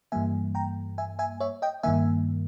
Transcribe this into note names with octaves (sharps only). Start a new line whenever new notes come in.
G2 E3 G3 A#3 E5 G#5
G5 A#5
E5 G#5
E5 G#5
C#5 E5
D#5 G5
G2 D#3 A#3 E5 G#5